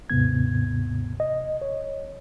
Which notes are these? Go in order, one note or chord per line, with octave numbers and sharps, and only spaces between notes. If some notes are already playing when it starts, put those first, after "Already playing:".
D#2 G#2 C3 B3 G#6
D#5
C#5